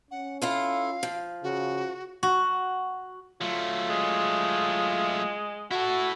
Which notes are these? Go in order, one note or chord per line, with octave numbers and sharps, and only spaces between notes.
C#4 F#5
E4 F4 A4 F5
F3
C#3 F#4
F#4
F#3 A3 F4
G#3
E4 F#4 A4